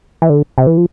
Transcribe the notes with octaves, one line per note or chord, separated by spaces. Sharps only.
E3
D3
C3
E3
F3